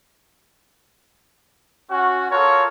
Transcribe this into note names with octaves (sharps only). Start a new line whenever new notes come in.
C#4 F#4
F4 A4 A#4 C#5